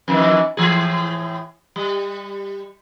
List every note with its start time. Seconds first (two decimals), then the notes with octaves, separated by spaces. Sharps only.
0.08 F2 D#3 E3
0.57 A2 E3 G#4
1.76 G3